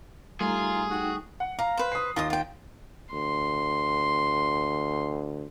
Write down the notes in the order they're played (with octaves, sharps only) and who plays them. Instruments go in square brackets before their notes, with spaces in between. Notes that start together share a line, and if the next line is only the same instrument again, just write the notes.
[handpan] G3 A3 [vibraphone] D#4 A#5 [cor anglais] F4 [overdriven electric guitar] G#4
[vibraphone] D#4 G5 C#6 [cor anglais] F#4
[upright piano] F#5
[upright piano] F5 [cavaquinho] A#5
[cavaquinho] B4 C5
[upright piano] D#6 C7
[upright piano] D#2 [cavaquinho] F4 D#5 D#6
[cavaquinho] F4 G5
[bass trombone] D2 [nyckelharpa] C6